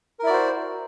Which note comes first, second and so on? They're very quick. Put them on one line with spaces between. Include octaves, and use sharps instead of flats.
A#4 E4 D5 F#4 C5